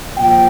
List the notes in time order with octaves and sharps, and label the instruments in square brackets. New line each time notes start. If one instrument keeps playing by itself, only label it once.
[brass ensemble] A#2 F3 G5